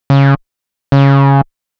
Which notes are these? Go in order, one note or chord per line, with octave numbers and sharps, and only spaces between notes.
C#3
C#3